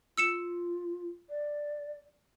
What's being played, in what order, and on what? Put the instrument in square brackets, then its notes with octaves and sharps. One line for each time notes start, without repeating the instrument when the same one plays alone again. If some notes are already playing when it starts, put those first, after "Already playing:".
[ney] F4 [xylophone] E6 C#7 E7
[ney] D5